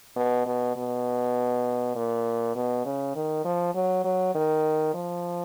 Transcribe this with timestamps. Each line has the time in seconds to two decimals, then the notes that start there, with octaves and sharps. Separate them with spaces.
0.16 B2
0.46 B2
0.76 B2
1.96 A#2
2.55 B2
2.85 C#3
3.15 D#3
3.45 F3
3.74 F#3
4.04 F#3
4.35 D#3
4.94 F3